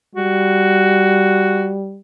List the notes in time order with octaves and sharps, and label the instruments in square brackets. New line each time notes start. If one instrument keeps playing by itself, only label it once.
[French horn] G3 [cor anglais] F#4